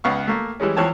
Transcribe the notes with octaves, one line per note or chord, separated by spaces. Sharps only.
C#2 B3 F5 C#6
A3 A#3
E3 G3 G#3 C#4
E2 E3 F3 C#5 G5 A5